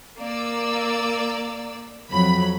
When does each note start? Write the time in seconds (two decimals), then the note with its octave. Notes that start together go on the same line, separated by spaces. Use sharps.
0.18 A#3 D5 E6
2.11 F2 F#3 B5